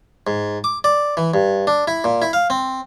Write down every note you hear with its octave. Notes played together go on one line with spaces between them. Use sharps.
G#2
D6
D5
E3
G2
D4
E4
A#2
E4
F5
C4